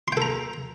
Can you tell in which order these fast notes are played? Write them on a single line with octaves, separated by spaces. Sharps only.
C6 G5 A4 A#5